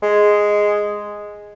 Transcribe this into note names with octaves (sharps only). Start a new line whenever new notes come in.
G#3